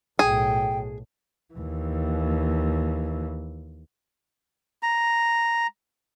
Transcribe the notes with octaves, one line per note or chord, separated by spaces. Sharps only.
B1 A2 G#4 G5
D#2 E3
A#5